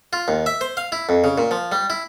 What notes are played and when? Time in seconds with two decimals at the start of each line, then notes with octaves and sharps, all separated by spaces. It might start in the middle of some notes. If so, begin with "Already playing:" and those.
0.13 F4
0.28 D#2
0.46 E5
0.61 C5
0.77 F5
0.92 E4
1.09 F2
1.24 C#3
1.38 A#2
1.51 F3
1.72 G3
1.90 E4